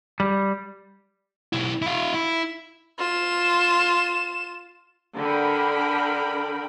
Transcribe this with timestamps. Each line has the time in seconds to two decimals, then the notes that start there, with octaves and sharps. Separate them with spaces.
0.20 G3
1.53 B1 E4
1.82 E4 F5
2.14 E4
2.98 F4 E7
5.16 D3 A#4 G5 B5